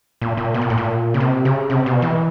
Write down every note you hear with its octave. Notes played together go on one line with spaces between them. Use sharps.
A#2
A#2
B2
A#2
A2
A#2
C#3
C3
C#3
C3
B2
E3